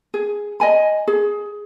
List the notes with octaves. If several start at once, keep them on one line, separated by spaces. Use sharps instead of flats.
G#4
D#5 G#5 B5
G#4